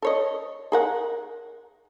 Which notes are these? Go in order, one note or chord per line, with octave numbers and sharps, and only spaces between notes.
A4 C#5 D#5
G#4 A#4 F#5